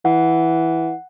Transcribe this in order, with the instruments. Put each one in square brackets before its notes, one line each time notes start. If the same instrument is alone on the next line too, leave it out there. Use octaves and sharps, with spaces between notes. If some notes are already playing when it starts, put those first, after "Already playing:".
[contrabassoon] E3 [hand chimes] F#5